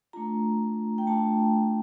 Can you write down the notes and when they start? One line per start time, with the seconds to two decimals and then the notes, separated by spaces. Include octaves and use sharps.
0.13 A3 D4 F4 A#5
0.98 G5
1.07 A3 D4 F4 A5